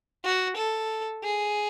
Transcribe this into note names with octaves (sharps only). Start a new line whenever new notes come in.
F#4
A4
G#4